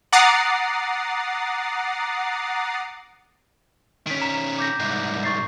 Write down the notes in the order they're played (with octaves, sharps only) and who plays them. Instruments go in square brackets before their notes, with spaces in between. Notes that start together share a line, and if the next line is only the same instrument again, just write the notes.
[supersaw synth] F#5 A#5 D6 D#6 A6 C7
[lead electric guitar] D#3 C#4 [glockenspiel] B6 D7
[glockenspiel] A#5 E7
D6 G6 A#6
[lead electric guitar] C2 G#2
[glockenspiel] C#6 A6 C7